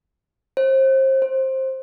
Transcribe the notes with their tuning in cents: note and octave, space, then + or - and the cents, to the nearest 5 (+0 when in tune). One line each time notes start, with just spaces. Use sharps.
C5 +30
C5 +15